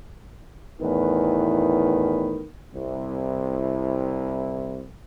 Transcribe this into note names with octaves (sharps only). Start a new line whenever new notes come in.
E2 A2 D#3 B4
C2 E4